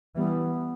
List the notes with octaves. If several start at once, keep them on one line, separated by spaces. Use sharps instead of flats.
E3 G3 B3